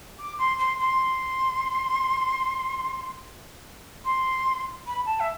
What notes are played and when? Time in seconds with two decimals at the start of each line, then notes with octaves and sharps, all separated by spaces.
0.19 D6
0.39 C6
0.59 C6
0.79 C6
4.05 C6
4.87 B5
5.06 A5
5.20 E5